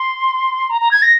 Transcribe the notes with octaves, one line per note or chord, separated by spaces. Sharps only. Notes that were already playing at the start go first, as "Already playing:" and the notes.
Already playing: C6
A#5
A#5
G#6
A#6